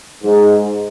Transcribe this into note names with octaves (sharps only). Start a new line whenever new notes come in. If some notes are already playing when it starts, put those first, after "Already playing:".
G#2